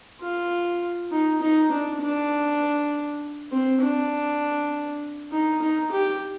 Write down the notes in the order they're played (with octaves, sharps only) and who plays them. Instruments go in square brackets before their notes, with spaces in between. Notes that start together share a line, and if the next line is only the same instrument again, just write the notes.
[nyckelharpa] F4
D#4
D#4
D4
D4
C4
D4
D#4
D#4
G4